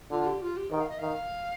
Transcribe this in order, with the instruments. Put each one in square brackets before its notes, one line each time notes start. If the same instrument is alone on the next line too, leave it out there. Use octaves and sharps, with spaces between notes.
[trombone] D3 [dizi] F4
[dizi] G4
F4
G4
[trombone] D#3 [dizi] G5
[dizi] F5
D#5
[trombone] D#3 [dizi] F5